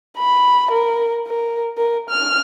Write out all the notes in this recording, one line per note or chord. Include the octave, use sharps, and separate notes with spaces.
B5
A#4
A#4
A#4
F6